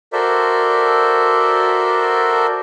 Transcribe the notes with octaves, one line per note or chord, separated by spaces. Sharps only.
F#4 A4 A#4 C5 D5 E5